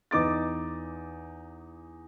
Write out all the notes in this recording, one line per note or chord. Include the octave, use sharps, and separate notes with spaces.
E2 D#4 D6 A6